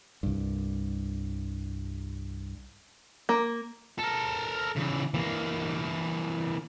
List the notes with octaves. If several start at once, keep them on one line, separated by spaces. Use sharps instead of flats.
C2 G2
A#3
A4 A#4
C#3 E3
E3 A#3